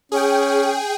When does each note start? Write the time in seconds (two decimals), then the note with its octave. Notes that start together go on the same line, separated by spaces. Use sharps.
0.12 C#4 G#4 G5